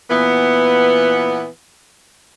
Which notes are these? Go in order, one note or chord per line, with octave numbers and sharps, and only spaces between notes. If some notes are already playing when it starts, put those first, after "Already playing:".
A#2 E3 B3